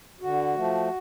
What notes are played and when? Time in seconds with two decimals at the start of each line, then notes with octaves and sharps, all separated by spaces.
0.21 D3 F#4
0.55 F3 A3